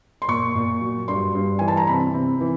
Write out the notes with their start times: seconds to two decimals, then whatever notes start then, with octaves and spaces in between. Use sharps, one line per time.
0.22 C6
0.28 A#2 C#6
0.55 A#2
0.81 F#3
1.08 G2 C6
1.34 G2
1.59 E3 G#5
1.68 A5
1.77 A#5
1.87 C3 B5
2.14 C3
2.41 E3